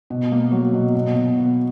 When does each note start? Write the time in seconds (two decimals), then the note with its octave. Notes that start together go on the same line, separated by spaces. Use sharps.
0.10 B2
0.32 A#3
0.52 F#3
0.74 B2
0.95 B2
1.16 B2
1.38 B3